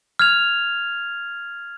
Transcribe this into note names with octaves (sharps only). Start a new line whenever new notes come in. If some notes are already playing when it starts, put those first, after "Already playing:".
F6 G#6 F7